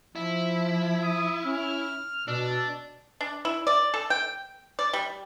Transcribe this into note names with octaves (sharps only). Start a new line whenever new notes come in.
F3 E4
D#6
C#4 F6
B2 D4 E6
D4
E4
D5
A4
G5
D5
G3